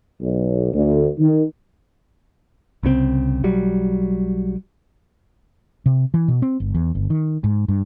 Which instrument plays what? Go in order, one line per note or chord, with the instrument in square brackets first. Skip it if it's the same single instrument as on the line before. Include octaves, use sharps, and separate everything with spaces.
[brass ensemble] B1
D2
D#3
[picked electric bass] C2 C#3 E3 C4
B1 F#3 G3
[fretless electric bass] C3
E3
B2
C4
G1
E2
G1
D#3
G#2
G2